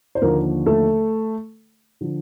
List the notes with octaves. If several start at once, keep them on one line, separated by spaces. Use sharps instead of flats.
C5
D#2 D3 F3 A#3 A#4
A3 A4
D3 F3